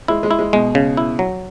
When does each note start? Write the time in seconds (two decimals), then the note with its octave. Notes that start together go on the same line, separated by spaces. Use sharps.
0.08 G#3 E4
0.23 G#3
0.31 E4
0.39 G#3
0.53 B2 G#3
0.75 C#3
0.97 E4
1.19 F#3